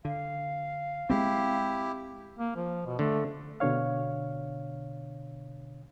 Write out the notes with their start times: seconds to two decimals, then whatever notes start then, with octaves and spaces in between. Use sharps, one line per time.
0.05 D3 F5
1.10 G#3 A3 C4 E4 G4
2.39 A#3
2.56 F3
2.86 B2
2.99 D3 A3
3.60 B2 D3 D4 C#5 F5